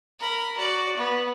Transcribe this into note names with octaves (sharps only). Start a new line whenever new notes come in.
A#4 B5
F#4 D5
B3